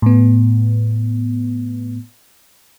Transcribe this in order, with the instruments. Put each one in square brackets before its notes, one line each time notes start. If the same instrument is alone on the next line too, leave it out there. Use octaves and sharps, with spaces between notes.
[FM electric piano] A2 B3